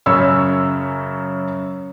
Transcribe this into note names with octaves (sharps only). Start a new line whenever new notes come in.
F#2 C#3 C#5 E6